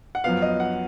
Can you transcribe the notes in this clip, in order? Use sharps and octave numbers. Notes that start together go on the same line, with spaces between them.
F#5
F#2 F3 B3 F5
D#5
F#5